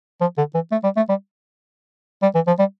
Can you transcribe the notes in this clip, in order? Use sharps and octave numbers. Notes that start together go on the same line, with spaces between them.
F3
D3
E3
A3
G3
A3
G3
G3
E3
F3
G3